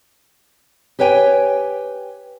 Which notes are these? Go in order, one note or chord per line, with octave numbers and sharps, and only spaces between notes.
G4 B4 C#5 G5 G#5